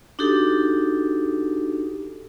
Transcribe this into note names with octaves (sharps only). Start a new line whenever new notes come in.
D4 D#4 F#4 G4 A4